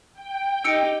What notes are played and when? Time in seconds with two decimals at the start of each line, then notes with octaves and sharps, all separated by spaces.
0.14 G5
0.64 D#4 G4 E6 C#7 D7